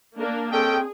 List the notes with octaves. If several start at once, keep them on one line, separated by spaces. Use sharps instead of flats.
A#3 D4 A#4
C4 C#4 G#4 A4 D#5 G5